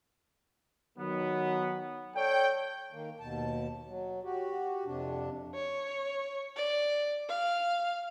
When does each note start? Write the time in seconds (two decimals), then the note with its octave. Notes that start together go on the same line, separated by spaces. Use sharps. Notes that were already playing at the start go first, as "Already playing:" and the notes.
0.98 D#3 F#3 B3
2.16 A4 C#5 D5 G5
2.92 D#3 A#3
3.20 D#2 B2 A5
3.86 F#3
4.23 F#4 G4
4.85 F2 C3 D4
5.54 C#5
6.57 D5
7.29 F5